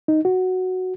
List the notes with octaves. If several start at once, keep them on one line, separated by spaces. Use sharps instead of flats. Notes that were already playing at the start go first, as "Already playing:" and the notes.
D#4
F#4